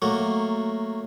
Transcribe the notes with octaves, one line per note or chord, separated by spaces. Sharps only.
F#3 A3 A#3